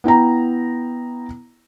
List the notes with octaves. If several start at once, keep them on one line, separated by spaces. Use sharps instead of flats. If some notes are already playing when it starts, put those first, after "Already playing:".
B3 E4 G5 A#5